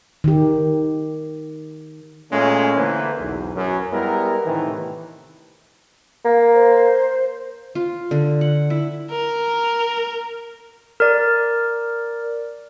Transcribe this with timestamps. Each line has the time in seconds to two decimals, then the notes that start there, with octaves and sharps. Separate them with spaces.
0.24 D#3 G4
2.32 A#2 G#3 A3 C#4
2.76 D3 E3 A#3 E4 B4 C5
3.19 B1 E2
3.56 F#2
3.92 G3 G#3 B3 E4 A#4
4.46 A2 C3 D#3 E3
6.25 A#3
6.54 C5
7.75 F4
8.11 D3
8.41 F#5
8.70 E4
9.11 A#4
11.00 A#4 D5